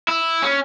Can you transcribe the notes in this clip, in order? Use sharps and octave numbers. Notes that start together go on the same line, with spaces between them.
E4
C#4